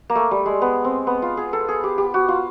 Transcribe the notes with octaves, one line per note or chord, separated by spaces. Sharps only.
A#3
A3
G3
G#3
B3
C4
B3
F4
G#4
A4
G#4
G4
G4
F#4
F4